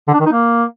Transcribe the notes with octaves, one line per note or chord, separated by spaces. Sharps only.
D3
D4
D#3
D#4
A#3